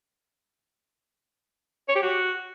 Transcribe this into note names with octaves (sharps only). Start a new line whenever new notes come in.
C#5
G4
F#4